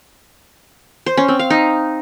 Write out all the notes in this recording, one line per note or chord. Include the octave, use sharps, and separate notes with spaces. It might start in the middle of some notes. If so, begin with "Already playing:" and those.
C5
C#4
C4
F5
D#4